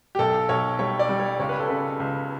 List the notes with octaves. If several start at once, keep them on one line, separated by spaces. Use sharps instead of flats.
G4
B1 A4
B1 C#5
G3 C#5
D5
G3
C#5
C#2 C#5
B4
A4
C#3 B4
C#2